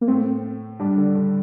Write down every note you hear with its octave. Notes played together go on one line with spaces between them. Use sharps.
A#3
A2 A3 C4
G2 G3 D4
D3
D3